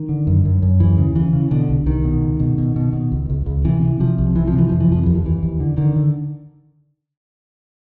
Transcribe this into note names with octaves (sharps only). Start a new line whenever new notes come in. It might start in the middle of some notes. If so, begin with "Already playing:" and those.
Already playing: D#3
D3
F#2
F#2
F#2
D#2 E3
C#3
C#3 E3
C#3
B2 D3
C2
C2 D#3
B2
C#2
B2
B2
B2
B2
C#2
C#2
C#2
C3 E3
C3
C3 F3
C2
C3 E3
F3
C3
E3
F2 F3
E3
F2 F3
D#2 E3
F3
D#2 E3
D#2
D3
D3 D#3
D3